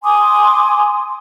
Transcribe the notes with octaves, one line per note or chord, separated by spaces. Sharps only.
G#5 C6 D6 D#6